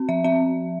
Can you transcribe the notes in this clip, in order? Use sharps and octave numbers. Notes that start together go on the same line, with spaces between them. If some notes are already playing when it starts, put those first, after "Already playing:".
Already playing: C4
F3 E5
C4 E5